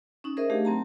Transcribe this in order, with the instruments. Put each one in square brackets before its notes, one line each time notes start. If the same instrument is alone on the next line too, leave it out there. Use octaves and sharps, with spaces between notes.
[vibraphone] C#4 D#4
D#4 G#4 A#4 C5 D#5 E5
A3 D4 G4 G#4 F5
F#3 C4 A5 A#5